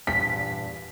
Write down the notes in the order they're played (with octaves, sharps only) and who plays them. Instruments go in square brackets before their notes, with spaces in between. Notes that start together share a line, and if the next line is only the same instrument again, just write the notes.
[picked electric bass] E2 G2 A#2 [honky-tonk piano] B6